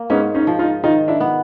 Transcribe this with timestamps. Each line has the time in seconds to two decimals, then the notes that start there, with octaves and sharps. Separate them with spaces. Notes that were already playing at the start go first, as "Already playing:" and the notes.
Already playing: A#3
0.10 G#2 B3 C#4
0.34 C#4 D#4
0.47 F3
0.59 D#4 F4
0.84 D#3 D#4 F4
1.08 D4 E4
1.20 B3